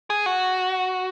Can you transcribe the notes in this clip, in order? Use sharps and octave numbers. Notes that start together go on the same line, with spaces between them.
G#4
F#4